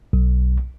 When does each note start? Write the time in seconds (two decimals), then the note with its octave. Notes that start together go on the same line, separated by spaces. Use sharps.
0.13 B1